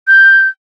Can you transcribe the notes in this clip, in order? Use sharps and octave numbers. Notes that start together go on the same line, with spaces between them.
G6